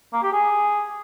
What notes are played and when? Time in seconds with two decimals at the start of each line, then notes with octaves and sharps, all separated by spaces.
0.13 A#3
0.22 G4
0.32 G#4